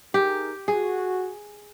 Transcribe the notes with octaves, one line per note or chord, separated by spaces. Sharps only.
D#4 G4 G#4 A#4
F#4 G#4